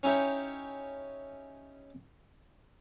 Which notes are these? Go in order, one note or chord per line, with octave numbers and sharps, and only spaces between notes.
C#4 D#4 E4 G4 C#5